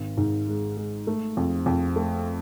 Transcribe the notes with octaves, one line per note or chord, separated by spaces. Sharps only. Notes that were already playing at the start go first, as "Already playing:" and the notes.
Already playing: G#1
G#2
G#3
G#3
A3
F2
F2
A3